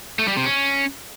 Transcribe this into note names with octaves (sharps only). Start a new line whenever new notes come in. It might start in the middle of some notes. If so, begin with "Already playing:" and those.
A3
G3
C3
C#4